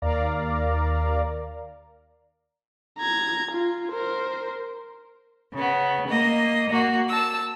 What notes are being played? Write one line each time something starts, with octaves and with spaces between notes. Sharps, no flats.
D#2 A#4 D5 F5 A#5
A#5 G#6
F4
A#4 C5
C#3 B3
A#3 D#5
A#3 F#4
A5 E6